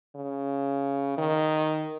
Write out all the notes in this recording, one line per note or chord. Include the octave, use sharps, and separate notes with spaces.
C#3
D#3